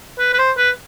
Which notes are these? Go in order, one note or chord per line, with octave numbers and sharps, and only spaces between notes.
B4
B4
C5
B4